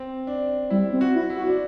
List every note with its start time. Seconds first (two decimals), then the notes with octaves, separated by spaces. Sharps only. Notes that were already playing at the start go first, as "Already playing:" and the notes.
Already playing: C4
0.27 D4
0.70 G3 E4
0.93 C4
1.01 F#4
1.15 E4
1.30 E4
1.37 F#4
1.47 D4